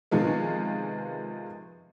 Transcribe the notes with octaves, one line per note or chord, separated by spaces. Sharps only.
C3 D#3 F3 G#3 B3